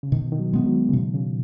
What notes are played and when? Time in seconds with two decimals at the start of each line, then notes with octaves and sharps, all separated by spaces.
0.03 C#3
0.12 B2 D#3
0.32 D#3
0.40 F#3
0.53 G#3 B3
0.66 F#3
0.89 C#3
0.93 B2 D#3
1.14 C#3